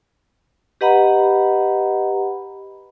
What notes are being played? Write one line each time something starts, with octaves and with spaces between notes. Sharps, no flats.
G4 B4 D#5 F#5 A#5 B5